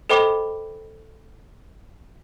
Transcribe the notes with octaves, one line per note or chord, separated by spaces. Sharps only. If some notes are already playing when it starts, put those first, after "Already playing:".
A4 C5 D#5 G5 B5 D6